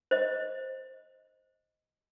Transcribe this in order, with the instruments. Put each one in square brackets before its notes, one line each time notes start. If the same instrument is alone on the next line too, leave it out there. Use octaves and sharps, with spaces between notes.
[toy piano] C5 D#5